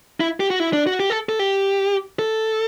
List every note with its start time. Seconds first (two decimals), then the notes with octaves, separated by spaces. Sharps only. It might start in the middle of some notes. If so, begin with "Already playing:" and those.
0.20 E4
0.40 G4
0.50 F#4
0.60 E4
0.73 D4
0.87 F#4
1.00 G4
1.10 A4
1.29 A4
1.39 G4
2.19 A4